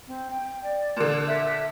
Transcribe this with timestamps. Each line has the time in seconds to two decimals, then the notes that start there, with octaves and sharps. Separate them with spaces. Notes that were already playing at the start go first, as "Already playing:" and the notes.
0.08 C4
0.31 G5
0.63 D5
0.97 A#2 D3
1.28 E5